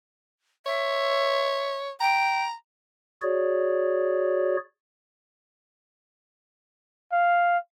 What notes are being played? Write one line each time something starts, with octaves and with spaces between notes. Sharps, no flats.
C#5 E5
G5 A#5
F#4 G#4 C#5 D5
F5